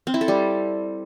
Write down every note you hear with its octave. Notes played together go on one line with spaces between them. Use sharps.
C4
E4
A4
G3